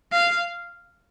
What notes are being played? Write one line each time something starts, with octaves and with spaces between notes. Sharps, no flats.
F5